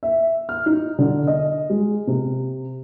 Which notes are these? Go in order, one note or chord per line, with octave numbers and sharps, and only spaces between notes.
E5
F6
D#4
D3
D#5
G#3
C3